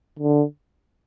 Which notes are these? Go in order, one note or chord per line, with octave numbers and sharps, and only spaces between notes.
D3